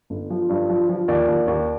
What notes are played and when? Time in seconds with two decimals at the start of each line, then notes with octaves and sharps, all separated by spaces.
0.10 G1
0.30 F3
0.49 G2
0.69 F3
0.89 F3
1.08 D#2 D5
1.28 D#2
1.48 D#2